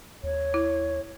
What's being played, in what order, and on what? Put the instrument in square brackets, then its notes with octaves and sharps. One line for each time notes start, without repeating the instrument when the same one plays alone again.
[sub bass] D#2 [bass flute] C#5
[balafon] E4